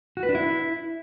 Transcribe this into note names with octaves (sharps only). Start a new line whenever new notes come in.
F#4
B4
D4
E4